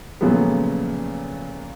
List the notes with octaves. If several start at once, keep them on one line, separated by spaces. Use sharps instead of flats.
A#2 C#3 F3 F#3 A3 B3